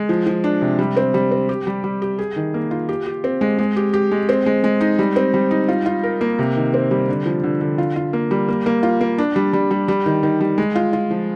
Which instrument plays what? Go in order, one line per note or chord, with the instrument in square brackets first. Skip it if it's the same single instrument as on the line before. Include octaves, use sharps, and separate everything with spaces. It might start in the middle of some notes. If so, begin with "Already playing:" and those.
Already playing: [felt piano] G#3
F3
F3
D4
C3
G3
C4
G3
C4
G4
G3
G3
G4
G#4
D#3
A#3
F4
G4
G4
C4
G#3
G#3
G4
G4
G#3
C4
G#3
G#3
D#4
G3
C4
G3
D#4
F4
F4
A#4
A#3
C3
D#3
C4
G3
D3
F3
D3
D3
F4
F4
A#3
G3
A#3
A#3
F4
A#3
D4
G3
G3
G3
G3
D#3
D#3
G3
G#3
F4
F4
F3